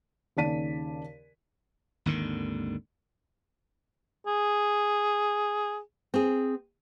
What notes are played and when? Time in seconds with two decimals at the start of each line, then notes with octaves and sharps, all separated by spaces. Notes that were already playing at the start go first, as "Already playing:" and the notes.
0.37 D#2 C#3 D5 A5 B6 D#7
2.06 G#1 D#2 D3 D#3
4.27 G#4
6.14 C4 G#4